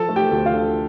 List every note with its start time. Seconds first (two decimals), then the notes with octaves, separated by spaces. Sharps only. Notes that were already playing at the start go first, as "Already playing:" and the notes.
Already playing: F3 A4 A5
0.09 A3
0.16 G4 G5
0.31 D2
0.46 F4 F5
0.54 D3